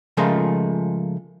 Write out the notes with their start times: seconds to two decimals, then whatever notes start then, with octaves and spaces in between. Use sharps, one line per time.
0.17 C#3 F3 G#3 A3 F4 A#4